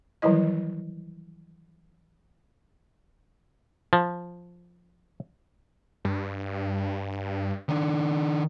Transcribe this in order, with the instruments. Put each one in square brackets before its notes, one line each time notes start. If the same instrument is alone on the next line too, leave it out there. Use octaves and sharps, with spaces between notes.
[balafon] D#3 E3 F#3 G3 E4 D#5
[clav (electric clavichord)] F3
[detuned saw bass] G2
[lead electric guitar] D#3 D4